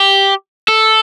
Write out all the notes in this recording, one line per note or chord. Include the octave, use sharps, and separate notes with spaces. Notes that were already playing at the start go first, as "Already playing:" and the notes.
Already playing: G4
A4